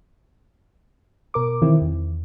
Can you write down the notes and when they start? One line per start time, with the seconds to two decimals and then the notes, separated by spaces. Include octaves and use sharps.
1.34 B2 A#4 D6
1.62 D#3 E3 C4 E4
1.82 E2